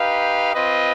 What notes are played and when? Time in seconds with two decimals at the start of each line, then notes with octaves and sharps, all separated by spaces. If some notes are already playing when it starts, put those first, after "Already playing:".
Already playing: D#4 G4 B4 F5
0.55 C4 F4 B4 D#5